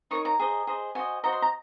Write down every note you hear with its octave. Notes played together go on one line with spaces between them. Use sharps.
D#4 A#4 C#5 C#6
A#5
G#4 C5 D#5
G#4 C5 D#5
F#4 C5 D#5 G#5
F#4 C5 D#5 A#5
C6
A#5